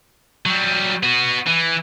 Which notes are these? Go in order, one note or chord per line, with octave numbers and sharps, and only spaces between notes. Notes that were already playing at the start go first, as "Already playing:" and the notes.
F#3 G3
B3 F#4
E3